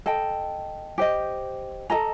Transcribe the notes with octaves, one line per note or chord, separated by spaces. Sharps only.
A4 D#5 G5
G4 C5 D#5
A4 D#5 A#5